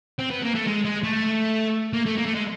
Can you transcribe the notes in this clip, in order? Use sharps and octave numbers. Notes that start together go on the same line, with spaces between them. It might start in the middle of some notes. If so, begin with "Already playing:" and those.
C4
B3
A#3
A3
G#3
G#3
A3
A#3
A3
A#3
A3
G#3